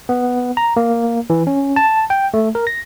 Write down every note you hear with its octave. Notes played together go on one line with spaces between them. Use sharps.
B3
A#5
A#3
E3
C#4
A5
G5
A3
A#4
A#6